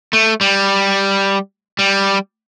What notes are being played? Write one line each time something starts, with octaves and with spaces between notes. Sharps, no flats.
A3
G3
G3